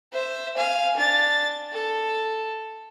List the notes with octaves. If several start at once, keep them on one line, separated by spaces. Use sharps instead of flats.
C5 E5
F5 G#5
D4 A6
A4